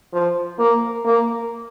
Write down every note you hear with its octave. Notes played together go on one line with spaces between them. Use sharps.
F3
A#3
A#3